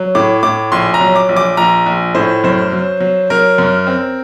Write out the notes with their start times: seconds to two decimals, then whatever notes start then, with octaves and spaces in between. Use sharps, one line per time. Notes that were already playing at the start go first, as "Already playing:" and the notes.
Already playing: F#3
0.15 A2 D6
0.43 A2 D6
0.72 A#1 C6
0.94 A#5
1.00 F#3
1.16 D6
1.29 A#1
1.36 D6
1.57 A#1 A#5
1.86 A#1
2.15 A2 C5
2.44 F#2 C5
2.72 F#3
3.00 F#3
3.30 F#3 A#4
3.58 F#2
3.87 C4